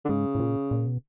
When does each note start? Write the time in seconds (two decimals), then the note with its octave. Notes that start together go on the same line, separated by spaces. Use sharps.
0.05 D3
0.09 G#2 C#3
0.35 A2
0.40 A#2
0.71 A#2
0.86 B2